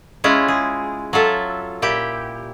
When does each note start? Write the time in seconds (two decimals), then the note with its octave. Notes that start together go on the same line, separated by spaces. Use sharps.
0.24 G#3 C#4 E4 F4
0.48 G#4
1.13 F#3 F4 A4 E5
1.82 A#2 E4 G4 G5